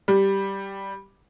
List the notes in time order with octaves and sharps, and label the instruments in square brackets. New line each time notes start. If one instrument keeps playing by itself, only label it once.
[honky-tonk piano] G3